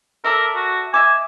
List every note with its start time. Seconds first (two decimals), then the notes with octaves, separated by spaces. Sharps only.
0.24 A4 A#4 D5 E5
0.55 F#4
0.94 D#5 E5 G#5 D6